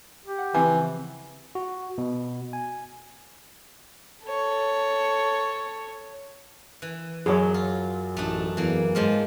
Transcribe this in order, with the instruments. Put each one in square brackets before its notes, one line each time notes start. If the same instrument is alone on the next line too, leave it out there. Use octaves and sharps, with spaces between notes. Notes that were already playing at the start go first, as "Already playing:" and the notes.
[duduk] G4
[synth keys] F#5
[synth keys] C#3 F3 C4 [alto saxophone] E3 [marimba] G#5
[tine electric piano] F#4
B2
G#5
[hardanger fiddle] A4 C#5
[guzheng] E3
[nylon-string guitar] F#2 F#3 [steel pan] G#4 C#5
[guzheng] F4
[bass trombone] A1 [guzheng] A3 D4 D#4
[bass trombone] E2 [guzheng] E3 A#3
[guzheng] G#2 F3 F4 [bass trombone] G#3